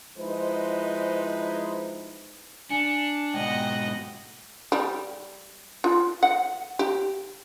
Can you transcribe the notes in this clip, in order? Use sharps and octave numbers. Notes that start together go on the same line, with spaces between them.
F3 G#3 D#4 E4 B4 C5
D4 G#5 C#7
G#2 B2 D#5 F#5 G5
G3
F4
F#5
G4